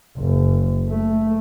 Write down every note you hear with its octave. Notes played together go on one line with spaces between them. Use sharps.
F#1
A3